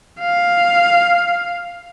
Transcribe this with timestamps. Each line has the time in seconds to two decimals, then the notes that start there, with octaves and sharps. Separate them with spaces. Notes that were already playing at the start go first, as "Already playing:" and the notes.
0.19 F5